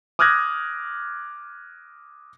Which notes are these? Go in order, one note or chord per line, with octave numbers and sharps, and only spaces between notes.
D6 D#6 F6 F#6 G#6 A#6